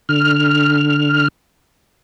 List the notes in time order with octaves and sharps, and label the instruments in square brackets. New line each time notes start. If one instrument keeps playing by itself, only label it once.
[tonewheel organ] D3 F6